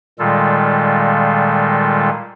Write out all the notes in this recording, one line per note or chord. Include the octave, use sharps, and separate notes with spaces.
A#2 D#3 G3 G#3 F4 A4